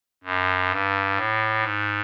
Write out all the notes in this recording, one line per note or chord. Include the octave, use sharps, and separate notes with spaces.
F#2
G2
A2
G#2